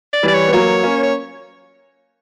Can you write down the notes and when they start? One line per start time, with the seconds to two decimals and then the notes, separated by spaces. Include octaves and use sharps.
0.13 D5
0.23 E3 G3 D5
0.34 C#5
0.48 B3
0.53 F#3 A#3 C#5
0.83 A#3 C#4
1.03 C#5